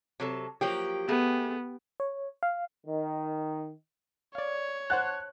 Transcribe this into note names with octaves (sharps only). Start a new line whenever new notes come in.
C3 F#3 A4
F3 F#3 A#3 G4
A3 B3 G#4
C#5
F5
D#3
C#5 D5 F5
C5 F#5 A5 F#6